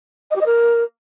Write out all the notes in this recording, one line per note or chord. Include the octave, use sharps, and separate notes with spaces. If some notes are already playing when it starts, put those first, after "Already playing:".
D#5
G4
D#5
A#4